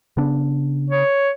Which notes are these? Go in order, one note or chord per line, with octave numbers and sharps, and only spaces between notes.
C#3 B3 D4
C#5